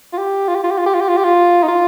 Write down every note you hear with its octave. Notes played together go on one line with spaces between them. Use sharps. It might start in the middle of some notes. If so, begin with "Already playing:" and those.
F4
G4
F4
G4
F4
G4
F4
G4
F4
G4
F4
G4
F4
D#4
F4